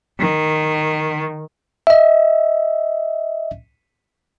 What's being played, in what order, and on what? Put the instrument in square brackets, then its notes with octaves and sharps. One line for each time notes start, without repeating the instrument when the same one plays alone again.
[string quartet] D#3
[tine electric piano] D#5 E5